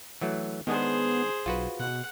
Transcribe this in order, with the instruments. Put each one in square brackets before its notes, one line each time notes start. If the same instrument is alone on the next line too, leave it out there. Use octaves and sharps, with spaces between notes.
[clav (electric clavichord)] E3 F#3 A3
[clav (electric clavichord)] D#3 G#3 D4 [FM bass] B3 [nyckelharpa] G#4 C5
[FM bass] B1 [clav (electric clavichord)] F4 F#4 B4
[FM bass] B2 [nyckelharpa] F#5